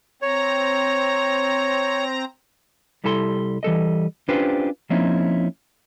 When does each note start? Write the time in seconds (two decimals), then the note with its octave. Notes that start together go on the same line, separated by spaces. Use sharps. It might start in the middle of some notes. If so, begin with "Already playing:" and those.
0.22 C4 C#5 A#5
3.04 C2 G3 E4 A4 A#5 C6
3.63 E3 G3 A4 D#5
4.28 C#4 D4 F4 G4 B4 C5
4.90 F3 A#3 C4 C#4 D#4 E4